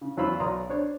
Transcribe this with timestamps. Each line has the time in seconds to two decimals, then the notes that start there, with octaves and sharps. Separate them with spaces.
0.01 C#3
0.17 E2 F#3 F4 C5 B5 E6
0.40 B1 F#4 D5 A#5 C6 D#6
0.69 D4 C5 C#5